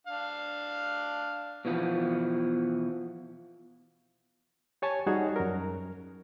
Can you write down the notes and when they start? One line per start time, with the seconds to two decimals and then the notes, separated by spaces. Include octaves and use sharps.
0.07 D4 F5
1.65 B2 E3 F3 B3
4.82 G4 C#5 G#5 A5
5.06 G3 D#4 F#4 G#4 C#5
5.36 F#2 A#4